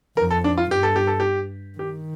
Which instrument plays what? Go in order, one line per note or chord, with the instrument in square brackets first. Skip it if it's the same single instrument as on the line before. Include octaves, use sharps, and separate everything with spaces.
[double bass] F2 [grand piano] A#4
[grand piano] A4
D4
F4
[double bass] G2 [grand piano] G4
[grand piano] A4
G4
A4
G4
[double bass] D#3 [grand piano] G4